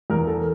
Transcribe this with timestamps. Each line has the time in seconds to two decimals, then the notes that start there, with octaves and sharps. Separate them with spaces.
0.10 E2 A#4
0.27 A4